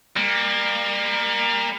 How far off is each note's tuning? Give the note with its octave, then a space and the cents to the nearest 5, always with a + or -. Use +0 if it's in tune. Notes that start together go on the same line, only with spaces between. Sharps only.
G3 +35 A#3 +0